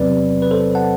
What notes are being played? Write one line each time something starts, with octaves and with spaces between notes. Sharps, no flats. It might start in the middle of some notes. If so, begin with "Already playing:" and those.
Already playing: E2 C3 F#3 C4 B4 D5
B4
A4 C5
F#5 A5